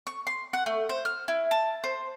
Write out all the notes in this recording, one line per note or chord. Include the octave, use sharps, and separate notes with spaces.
C#6
C6
F#5
A3
C5
F6
E4
A5
C5